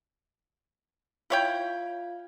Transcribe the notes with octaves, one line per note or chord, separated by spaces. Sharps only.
E4 F4 C#5 F5 G5 G#6